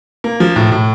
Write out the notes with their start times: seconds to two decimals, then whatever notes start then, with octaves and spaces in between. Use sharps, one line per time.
0.24 A#3
0.40 F3
0.56 A2
0.72 A2